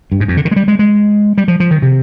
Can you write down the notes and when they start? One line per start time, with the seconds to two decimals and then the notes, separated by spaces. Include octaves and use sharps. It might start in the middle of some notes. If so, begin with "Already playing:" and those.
0.12 G2
0.20 G#2
0.28 F2
0.37 D3
0.45 D#3
0.51 G#3
0.56 G3
0.68 G#3
0.79 G#3
1.38 G3
1.48 F3
1.60 F3
1.71 D#3
1.82 C3